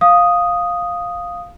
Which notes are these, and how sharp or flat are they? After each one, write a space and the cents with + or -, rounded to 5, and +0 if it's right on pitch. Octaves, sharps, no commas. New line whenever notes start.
F5 +5 D#6 +0